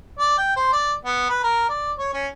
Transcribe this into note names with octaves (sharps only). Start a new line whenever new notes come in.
D5
G5
C5
D5
B3
B4
A#4
D5
C#5
C#4